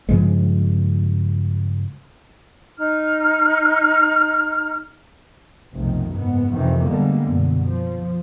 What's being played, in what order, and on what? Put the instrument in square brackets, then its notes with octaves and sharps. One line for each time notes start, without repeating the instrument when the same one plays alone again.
[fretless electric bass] G2 C#3 F3 G#3
[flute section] D#4 F6
[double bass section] F1 B1 D#3
F#1 G#2 B3
F2 C3 D#3 E3
D3 G3 G#3 A#3 B3
F#2 B2 D3
F3